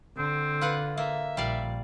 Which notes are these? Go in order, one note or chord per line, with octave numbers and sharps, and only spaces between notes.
D3 C4
F4 B4 F#5
A#3 E5
A#1 G3 D5 F5